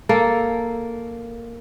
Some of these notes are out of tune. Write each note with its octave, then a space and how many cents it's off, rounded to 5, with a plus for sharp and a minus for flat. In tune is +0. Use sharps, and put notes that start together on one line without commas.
A#3 +0 A4 +0